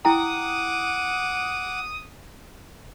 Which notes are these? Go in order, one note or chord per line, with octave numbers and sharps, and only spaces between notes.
E4 F#5 G5 A#5 D6 D#6